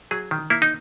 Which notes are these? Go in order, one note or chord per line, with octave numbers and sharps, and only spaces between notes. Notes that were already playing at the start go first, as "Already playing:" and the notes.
F#3 G#4
D#3
A#3 E4
D#4